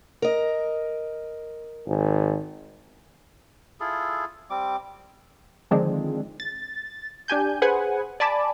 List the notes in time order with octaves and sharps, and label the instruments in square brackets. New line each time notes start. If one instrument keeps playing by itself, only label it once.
[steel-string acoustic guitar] A#4 D#5
[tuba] G#1
[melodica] E4 F4 G#4 A4
G3 C4 D6
[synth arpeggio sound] D3 D#3 F3 G#3 C4 D4
A6
D4 G4 G#5 G6
G#4 B4 C5 F#5 G#5
D5 G#5 A5 B5 D6